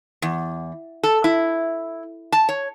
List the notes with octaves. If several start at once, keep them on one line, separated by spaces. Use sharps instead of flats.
E2
A4
E4
A5
C#5